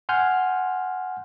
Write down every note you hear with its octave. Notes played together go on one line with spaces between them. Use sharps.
F#5 G#5 C6 F6 G6